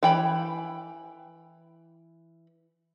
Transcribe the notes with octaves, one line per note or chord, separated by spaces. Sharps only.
E3 G5 B5